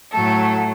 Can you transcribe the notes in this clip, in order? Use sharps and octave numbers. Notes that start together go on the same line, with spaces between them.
A2 F#3 A3 A4